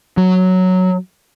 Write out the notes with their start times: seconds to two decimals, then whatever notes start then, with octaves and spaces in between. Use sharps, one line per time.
0.17 F#3